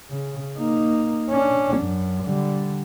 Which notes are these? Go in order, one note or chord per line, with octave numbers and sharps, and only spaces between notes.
C#3
A#3 D#4
C#4 D4
F#2
D3 G3